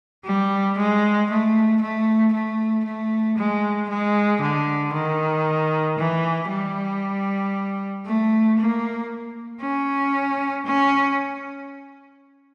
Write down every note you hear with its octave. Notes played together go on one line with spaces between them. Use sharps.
G3
G#3
A3
A3
A3
A3
G#3
G#3
D3
D#3
E3
G3
A3
A#3
C#4
C#4